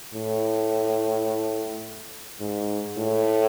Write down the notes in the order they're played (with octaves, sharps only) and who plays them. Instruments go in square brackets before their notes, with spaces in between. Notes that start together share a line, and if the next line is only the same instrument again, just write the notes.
[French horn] A2
G#2
A2